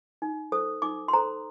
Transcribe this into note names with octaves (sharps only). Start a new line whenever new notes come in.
D#4
A4 C5 D#6
D#4 D6
C6
A4 C5 A#5